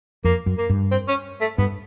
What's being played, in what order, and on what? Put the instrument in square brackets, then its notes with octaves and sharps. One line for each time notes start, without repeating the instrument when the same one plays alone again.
[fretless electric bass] F2 [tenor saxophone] A#3
[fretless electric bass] F#2
[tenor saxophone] A#3
[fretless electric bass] G2
[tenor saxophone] C4
C#4
A3
[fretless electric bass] G2 [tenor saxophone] B3